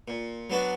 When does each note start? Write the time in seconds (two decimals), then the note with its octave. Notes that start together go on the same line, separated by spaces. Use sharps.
0.08 A#2
0.50 F#3 B3 D4 F#4